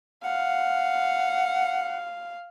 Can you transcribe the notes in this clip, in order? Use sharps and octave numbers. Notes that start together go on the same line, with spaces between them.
F5 F#5